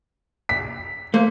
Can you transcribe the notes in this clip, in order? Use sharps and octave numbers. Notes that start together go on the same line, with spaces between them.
B6
A3 A#3 C5